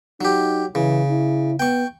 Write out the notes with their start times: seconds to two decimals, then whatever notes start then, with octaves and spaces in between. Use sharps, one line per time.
0.21 F#3 D#4 G4
0.75 C#3 E3
1.10 E4
1.60 B3 G5 C#6